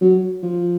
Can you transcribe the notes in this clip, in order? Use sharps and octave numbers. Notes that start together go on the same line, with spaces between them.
F#3
F3